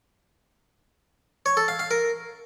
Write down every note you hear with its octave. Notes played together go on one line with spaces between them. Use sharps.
C#5
A4
F5
F5
A#4